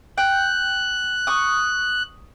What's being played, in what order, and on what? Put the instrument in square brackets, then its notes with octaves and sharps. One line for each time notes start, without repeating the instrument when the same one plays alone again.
[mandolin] G5 [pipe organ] F#6
[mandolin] C#6 D#6